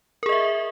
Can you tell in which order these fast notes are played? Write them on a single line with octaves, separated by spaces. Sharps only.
A#4 G#4 D#5 E5